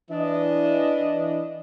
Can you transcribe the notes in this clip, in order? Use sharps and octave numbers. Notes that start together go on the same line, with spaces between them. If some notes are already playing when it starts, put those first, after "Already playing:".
E3 D4 D#5